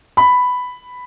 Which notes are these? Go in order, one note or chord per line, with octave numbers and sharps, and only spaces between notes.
B5